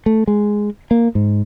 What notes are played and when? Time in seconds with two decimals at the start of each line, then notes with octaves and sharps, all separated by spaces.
0.06 A3
0.27 G#3
0.91 A#3
1.15 G#2